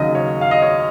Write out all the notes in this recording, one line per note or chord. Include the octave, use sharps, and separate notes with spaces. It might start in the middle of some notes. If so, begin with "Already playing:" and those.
Already playing: D#2 C#3 F#3 D#5
C#5
F5
D#5
C#5